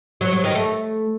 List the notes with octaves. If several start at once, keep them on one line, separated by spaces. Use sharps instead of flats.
F#3
F#3
D#3
A3